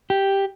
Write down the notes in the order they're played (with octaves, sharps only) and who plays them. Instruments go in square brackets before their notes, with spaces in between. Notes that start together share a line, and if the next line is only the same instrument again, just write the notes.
[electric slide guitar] G4